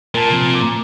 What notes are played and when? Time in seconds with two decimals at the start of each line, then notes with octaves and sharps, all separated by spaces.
0.15 A#2 A#4 A5
0.30 C3 F3 C4
0.55 D6